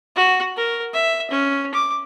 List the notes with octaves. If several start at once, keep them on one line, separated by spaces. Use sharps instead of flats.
F#4
A#4
E5
C#4
D6